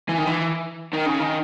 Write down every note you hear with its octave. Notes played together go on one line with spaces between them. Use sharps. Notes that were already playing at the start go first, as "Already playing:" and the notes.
E3
D#3
E3
D#3
C#3
D#3